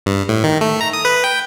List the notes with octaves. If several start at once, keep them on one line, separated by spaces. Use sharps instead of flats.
G2
A2
D#3
A3
A#5
D#6
B4
G5